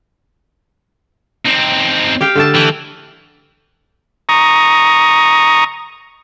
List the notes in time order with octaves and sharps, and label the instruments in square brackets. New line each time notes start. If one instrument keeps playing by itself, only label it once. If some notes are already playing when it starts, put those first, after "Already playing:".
[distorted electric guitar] C4 D#4
[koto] G4 F5 G5
D3 A3 A5
[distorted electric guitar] E3 [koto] G5
[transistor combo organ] A#5 C#6 D#6